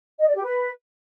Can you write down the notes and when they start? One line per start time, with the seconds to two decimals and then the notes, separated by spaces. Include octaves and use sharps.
0.19 D#5
0.27 D5
0.35 G4
0.44 B4